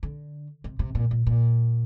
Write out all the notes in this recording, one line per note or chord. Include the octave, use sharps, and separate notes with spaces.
D3
C3
C3
A#2
A#2
A#2